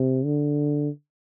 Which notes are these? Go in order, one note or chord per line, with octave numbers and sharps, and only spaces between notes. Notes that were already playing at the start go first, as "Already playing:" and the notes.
Already playing: C3
D3